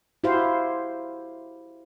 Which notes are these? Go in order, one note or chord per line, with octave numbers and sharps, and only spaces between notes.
E4 F#4 G4 C5 F5